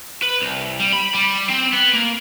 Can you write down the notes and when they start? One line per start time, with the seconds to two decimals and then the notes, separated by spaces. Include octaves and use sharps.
0.22 B4
0.42 C2
0.80 G3
0.93 B5
1.14 G3
1.49 C4
1.72 B3
1.93 A#3